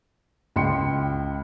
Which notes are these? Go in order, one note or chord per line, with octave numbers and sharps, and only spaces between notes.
C#2 G5 C6 C#7